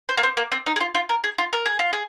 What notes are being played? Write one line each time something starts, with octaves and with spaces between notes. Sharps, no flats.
C5
A#3
C4
A#3
C4
D#4
G#4
F4
F4
A#4
G#4
F4
A#4
G#4
F4
G#4